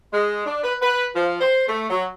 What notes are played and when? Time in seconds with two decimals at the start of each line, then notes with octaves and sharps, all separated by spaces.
0.12 G#3
0.46 D4
0.63 B4
0.81 B4
1.14 F3
1.40 C5
1.67 A3
1.90 F#3